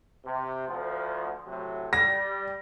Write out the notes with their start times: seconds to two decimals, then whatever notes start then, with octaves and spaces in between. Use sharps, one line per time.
0.24 C3
0.67 D2 F3
1.46 A2 C3 F#3
1.93 G3 A#6